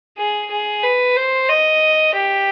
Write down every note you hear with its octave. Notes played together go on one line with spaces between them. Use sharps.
G#4
G#4
B4
C5
D#5
G4